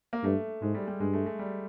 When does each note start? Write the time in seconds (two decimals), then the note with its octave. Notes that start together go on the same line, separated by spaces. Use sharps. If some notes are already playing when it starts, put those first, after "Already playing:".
0.13 A#3
0.23 G2 A3
0.62 G#2 G#3
0.75 G3
0.87 G3
1.00 G2 G#3
1.14 A3
1.26 A3
1.39 G3